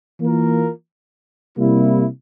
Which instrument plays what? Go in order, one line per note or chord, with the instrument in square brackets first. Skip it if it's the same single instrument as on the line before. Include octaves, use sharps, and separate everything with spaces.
[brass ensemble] E3 A#3 F4 A#4
C3 G3 A#3 E4